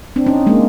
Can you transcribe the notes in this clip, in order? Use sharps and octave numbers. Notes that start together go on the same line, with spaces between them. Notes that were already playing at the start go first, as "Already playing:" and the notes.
C4 D4
C#4 D#4
G#3 A#3